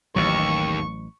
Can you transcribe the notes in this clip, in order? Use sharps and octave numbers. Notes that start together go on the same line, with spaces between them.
A1 D#2 F#3 C#6